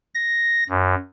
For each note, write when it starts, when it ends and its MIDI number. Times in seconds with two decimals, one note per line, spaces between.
0.15 0.64 94
0.69 0.95 42